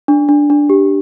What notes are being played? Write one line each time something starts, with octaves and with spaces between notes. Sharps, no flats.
D4
D4
D4
G4